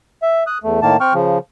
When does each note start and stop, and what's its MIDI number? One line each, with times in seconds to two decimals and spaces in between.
0.22 0.44 76
0.47 0.58 87
0.47 0.58 90
0.64 0.80 40
0.64 0.80 57
0.82 0.97 45
0.82 0.97 51
0.82 0.97 58
0.82 0.97 81
1.01 1.14 60
1.01 1.14 79
1.01 1.14 85
1.01 1.14 89
1.14 1.38 49
1.14 1.38 53